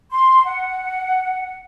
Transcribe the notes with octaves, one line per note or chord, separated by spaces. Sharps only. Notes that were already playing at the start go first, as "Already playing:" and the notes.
C6
F#5